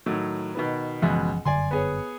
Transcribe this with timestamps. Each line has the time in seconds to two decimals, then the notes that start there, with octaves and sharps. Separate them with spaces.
0.06 A2 D#3 F#3
0.55 B2 D#3 B3
1.02 F#1 C#2 B2 E3 F3
1.45 F#1 G2 D3 D5 G#5 C6
1.71 B3 G#4 C#5